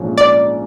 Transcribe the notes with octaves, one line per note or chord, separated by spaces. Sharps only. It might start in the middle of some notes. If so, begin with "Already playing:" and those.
Already playing: A#1 G#2 F3 A3 C#4
D5